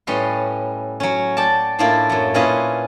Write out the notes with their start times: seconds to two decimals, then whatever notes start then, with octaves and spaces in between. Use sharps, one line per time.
0.07 A2 G3 C#4 B4 D#5 C6
1.00 F#3 C#4
1.37 D5 G5 A5
1.79 A2 A#3 D4 E4 F4 D5
2.10 F#2 F#3
2.34 A#2 C#4 E4 F4 B4 D#5